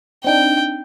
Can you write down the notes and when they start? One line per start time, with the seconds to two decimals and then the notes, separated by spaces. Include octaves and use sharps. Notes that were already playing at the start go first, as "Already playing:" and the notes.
0.24 C4 D4 D#4 G5